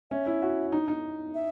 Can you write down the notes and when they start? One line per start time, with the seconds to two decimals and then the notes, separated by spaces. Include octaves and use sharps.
0.11 C#4 E5
0.26 E4
0.42 F#4
0.72 D#4
0.88 D#4
1.34 E5